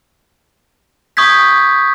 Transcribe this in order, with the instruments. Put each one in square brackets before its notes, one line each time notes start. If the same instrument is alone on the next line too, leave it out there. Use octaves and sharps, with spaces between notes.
[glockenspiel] C#6 D#6 G6 G#6 B6